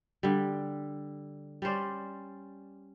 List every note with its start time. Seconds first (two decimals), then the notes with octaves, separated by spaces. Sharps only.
0.23 D3 G3
1.62 G3 C#4 C5 D5